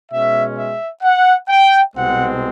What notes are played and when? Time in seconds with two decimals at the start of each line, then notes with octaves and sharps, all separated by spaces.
0.11 B2 G#3 C#4 E5
0.57 E5
1.03 F#5
1.49 G5
1.95 C2 B2 G#3 C4 F#5